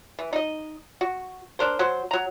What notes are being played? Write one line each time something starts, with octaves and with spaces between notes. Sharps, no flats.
E3
D#4 D#5
F#4
D4 A#4 C5
F#3 C5
F#3 A#5